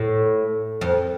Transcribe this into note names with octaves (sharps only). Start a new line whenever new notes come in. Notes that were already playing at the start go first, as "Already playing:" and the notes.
Already playing: A2
F2